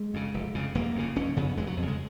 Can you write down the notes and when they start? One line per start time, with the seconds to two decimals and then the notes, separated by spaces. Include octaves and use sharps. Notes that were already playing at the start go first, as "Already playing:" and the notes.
Already playing: G#3
0.14 F2 C#3
0.34 F1
0.55 F2 C#3
0.75 F1 A#3
0.96 F2 C#3
1.16 F1 C#4
1.37 F2 C#3 B3
1.57 F1 G#3
1.67 F#3
1.77 F2
1.82 C#3
1.88 G#3